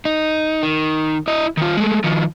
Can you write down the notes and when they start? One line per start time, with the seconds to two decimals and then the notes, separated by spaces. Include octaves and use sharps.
0.05 D#4
0.63 D#3
1.28 E4 D#5
1.57 D#3 F4
1.77 G#3 A3
2.04 D#3 F3